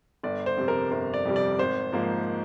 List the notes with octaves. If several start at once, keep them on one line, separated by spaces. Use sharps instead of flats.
G1 D5
C5
F2 C3 G3
A#4
G1 C5
D5
F2 C3 G3
D5
G#1 C5
G#2 F3 A#3